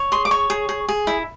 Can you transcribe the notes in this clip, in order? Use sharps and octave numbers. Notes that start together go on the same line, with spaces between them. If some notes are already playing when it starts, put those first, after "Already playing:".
Already playing: C#5
G#4 C6
D6
C#5 C#6
G#4
G#4
G#4
E4